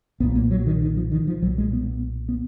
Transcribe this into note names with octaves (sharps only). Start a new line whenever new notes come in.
B1 A#2 B3
A#3
F#3
D#3
D#3
F3
D#3
F3
B1 A#2 F#3
G#3
B3
B3